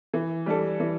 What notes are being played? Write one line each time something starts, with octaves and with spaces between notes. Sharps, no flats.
E3
G3 D4 A4
E3